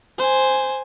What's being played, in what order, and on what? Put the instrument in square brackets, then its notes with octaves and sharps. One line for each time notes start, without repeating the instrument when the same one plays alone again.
[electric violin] C5 G#5